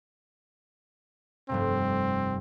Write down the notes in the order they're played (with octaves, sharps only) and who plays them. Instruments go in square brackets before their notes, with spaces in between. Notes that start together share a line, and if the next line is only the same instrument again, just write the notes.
[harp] F1 G2 C3 [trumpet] C4